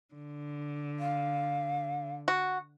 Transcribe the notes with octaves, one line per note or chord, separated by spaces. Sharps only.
D3
F5
F#4